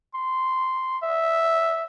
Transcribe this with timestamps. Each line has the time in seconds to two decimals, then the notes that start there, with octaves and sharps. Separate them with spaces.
0.15 C6
1.03 E5